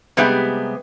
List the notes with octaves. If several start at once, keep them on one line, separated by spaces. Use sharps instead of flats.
C3 G3 G#3 B3 G4